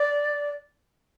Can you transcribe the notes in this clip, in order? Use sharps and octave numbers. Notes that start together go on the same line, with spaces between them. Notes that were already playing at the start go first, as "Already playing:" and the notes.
Already playing: D5